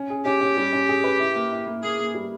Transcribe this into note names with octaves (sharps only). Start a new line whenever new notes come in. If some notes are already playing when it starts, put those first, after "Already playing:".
Already playing: C#4
G#4
C#4 G4
C#4
G3
C#4
G#4
B4
E4
A#3
E4
A#3
A#3 G#4
A#3
G3